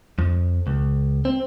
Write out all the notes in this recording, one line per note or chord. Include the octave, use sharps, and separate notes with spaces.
F2
C#2
C4